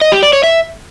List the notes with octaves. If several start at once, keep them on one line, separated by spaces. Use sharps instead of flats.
D#5
G4
D5
C#5
E5